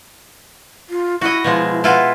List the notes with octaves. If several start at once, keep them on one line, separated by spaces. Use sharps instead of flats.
F4
E4 F#4 D#5
B2 F3 G#3
E4 F4 B4 F#5